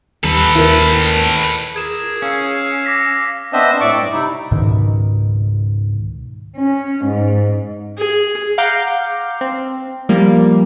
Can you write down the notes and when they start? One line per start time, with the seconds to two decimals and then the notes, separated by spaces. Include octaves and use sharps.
0.24 D#2 G3 A4 B4
0.55 D#2 E4 A#4
1.76 G#4 A#4 G#6 E7
2.22 C#4 F5 E6
2.85 D6 A#6 B6
3.53 B3 C4 D4 C5 D#5 E5
3.80 A2 D5 E5 C#6 D6
3.98 G2
4.13 C3 D#4 E4
4.51 C#2 G#2 B2 D#3
6.56 C#4
7.05 G#2
7.98 G#4
8.58 F5 F#5 A#5 D6 G6
9.41 C4
10.09 F3 G3 A#3